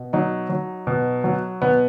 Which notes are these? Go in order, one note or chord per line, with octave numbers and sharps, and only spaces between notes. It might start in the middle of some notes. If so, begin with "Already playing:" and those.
Already playing: B2
F#3 D#4
F#3
B2
F#3
B2 B3